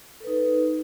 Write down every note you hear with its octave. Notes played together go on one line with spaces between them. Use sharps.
D#4 A4 B4